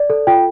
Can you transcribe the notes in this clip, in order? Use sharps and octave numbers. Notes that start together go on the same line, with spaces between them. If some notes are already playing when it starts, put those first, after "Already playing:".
Already playing: D5
A4
F4 G5